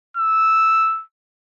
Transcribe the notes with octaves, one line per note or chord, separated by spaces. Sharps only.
E6